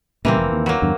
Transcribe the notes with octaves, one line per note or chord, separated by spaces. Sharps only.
A#2 C#3 E3 G3 A#3 C4
F1
D#2
F#3 A#3
E2 G2 D3